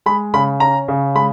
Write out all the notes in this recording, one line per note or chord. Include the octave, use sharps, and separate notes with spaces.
G#3 B5
C#3 B5
C#4 A#5
C#3
G#3 B5